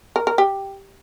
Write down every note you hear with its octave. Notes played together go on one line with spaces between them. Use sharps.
A#4
A#4
G4